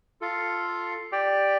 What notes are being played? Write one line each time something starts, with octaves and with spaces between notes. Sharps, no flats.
F4 A4 F5
G4 D5 G5